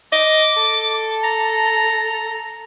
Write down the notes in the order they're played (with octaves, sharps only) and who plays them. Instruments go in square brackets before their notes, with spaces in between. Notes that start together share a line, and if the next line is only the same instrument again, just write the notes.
[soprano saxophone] D#5 [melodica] D6
[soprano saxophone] A4
[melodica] A#5